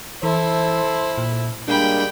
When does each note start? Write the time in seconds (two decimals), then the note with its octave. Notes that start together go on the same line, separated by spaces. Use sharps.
0.23 E3 E4 A4 C5
1.18 A#2
1.68 G3 G#3 A#3 D4 G5 B5